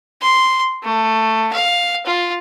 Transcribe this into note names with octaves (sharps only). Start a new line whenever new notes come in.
C6
A3
F5
F4